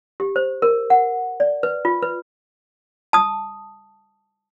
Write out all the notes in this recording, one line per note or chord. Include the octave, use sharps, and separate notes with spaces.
G4
C5
A#4
F#5
D5
B4
F4
B4
A5 D#6